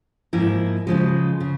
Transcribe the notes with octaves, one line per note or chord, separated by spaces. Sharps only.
G#2 F3 A#3 E4 A#4
C#3 F3 G#3
C#3